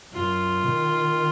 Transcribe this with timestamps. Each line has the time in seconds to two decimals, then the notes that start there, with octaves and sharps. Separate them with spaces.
0.13 F#2 F4
0.65 D#3